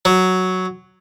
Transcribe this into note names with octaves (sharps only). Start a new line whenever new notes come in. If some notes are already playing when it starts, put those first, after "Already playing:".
F#3